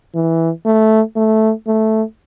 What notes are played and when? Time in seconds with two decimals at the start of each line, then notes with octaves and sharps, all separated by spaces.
0.15 E3
0.65 A3
1.16 A3
1.67 A3